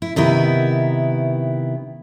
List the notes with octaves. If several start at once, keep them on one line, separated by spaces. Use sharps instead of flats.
E4
C3 D#3 B3 E4